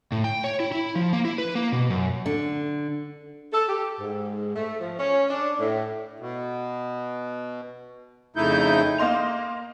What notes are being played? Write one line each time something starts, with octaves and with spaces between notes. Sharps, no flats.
A2
G5
C#5
E4
E4
F3
A#3
E4
B4
A#3
B2
F#2
D3
A4
G4
G#2
A3
F3
C#4
D4
A2
B2
F2 C#3 A3 D#4 E4 G6
A#3 D#5 C6 F7